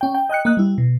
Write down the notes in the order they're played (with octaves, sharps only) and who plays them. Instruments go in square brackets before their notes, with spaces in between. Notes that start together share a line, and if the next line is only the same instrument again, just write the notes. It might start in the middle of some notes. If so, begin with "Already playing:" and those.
[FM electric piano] C#4 G5
G5
D#5 G5 F#6 C#7
A#3 D#5 F#6
G3 E4
B2